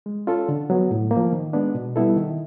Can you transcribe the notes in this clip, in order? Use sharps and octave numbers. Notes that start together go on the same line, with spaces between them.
G#3
C#4 F4 A4
D3
F#3 B3
A2
A#3
F3
D#3
G#3 B3 D4
B2
G3 B3 E4 A4
D#3